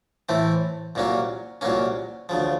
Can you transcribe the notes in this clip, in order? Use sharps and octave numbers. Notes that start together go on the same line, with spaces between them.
A2 E3 A3 C4
C2 A#2 F#3 A#3 C#4
C2 A#2 F#3 A#3 C#4
D2 C#3 F3